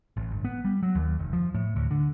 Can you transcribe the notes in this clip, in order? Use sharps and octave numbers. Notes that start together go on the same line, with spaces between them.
A1
G1
B3
G3
F#3
D#2
F1
F3
A2
D2
D3